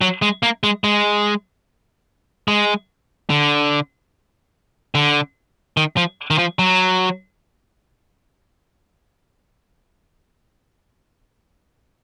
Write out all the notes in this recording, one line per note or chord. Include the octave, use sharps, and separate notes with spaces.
F#3
G#3
A#3
G#3
G#3
G#3
D3
D3
D#3
F3
D#3
F3
F#3